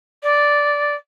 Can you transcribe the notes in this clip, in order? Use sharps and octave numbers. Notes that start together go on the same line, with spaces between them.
D5